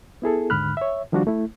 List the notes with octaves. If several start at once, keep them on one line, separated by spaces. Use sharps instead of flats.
B3 E4 G#4 A4
D#2 G#2 D3 B5 F6 F#6
C#5 E5
D#3 F3 G3 D4 F4 F#4
A3 E4